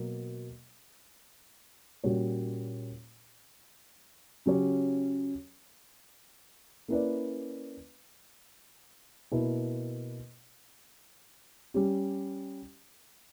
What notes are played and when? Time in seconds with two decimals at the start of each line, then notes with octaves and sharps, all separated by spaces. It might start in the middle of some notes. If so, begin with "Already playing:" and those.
Already playing: B2 F#3 A#3
2.04 A#2 G3 C#4 F#4 C#5
4.46 C#3 F#3 C#4 G4 C#5
6.88 A#3 C#4 E4 B4 D5
9.32 B2 A#3 E4 B4
11.74 G3 C#4 G4